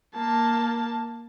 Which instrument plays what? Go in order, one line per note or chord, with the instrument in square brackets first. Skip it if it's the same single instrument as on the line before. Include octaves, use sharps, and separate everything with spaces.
[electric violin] A#3 A5